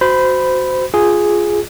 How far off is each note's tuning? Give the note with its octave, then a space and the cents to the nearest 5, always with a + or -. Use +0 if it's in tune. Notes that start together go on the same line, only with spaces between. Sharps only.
F#4 +0 C5 -20 B5 +0
F4 +0 G#4 +0